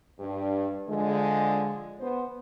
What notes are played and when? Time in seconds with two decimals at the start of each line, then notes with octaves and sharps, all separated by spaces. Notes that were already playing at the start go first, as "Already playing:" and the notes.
0.20 G2
0.89 D3 F3 G#3
2.00 B3 C5